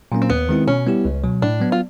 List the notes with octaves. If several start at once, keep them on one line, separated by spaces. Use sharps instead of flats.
A#2 F#3 A#3 C#4
C4
D#2 B3
D#3 G#3 C4 E4
B2 C#4
G3 B3 E4 G4
C#2
B2 F#3
A2 D4
F#3 B3
F4